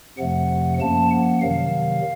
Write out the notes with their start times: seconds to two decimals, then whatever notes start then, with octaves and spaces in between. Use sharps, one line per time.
0.18 F2 C3 F3 A3 F#5
0.80 F#2 F3 A#3 A5
1.11 F#5
1.42 C3 D#3 F#3 F5